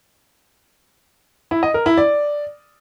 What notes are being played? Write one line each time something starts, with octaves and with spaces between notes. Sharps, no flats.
E4
D#5
A#4
E4
D5